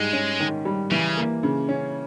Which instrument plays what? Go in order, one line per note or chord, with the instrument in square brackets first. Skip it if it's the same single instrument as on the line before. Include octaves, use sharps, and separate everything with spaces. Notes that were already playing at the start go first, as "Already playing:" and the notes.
Already playing: [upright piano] G#2 G3 [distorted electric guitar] G#3
[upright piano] C#4
D#3
G3
[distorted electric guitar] C#3 [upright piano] E3
[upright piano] A#3
C#3
C#4